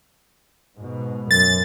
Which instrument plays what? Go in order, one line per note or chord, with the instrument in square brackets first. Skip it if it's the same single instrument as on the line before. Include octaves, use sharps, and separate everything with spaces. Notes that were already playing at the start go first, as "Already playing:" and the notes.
[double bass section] G#2 B2
[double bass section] F#2 [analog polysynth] A6